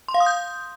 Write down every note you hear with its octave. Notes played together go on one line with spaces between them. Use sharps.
C6
F5
D#6
G6